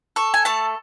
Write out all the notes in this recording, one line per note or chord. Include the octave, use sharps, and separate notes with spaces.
A4 C#6
G#5
A3 A5